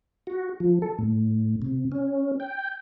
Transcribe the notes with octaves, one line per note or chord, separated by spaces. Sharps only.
F#4
F3
A4
A2
C3
C#4
G5